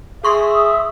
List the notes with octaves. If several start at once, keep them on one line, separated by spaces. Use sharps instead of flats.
G#4 E5 C6 C#6 D#6